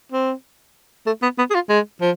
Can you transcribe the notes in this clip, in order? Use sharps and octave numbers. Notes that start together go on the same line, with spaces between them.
C4
A3
B3
B3
G#4
F4
G#3
F3